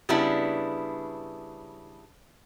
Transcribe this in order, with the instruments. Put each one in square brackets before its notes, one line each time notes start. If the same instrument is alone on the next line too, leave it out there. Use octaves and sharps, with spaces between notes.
[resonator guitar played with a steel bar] C#3 G3 B3 C#4 D4 E4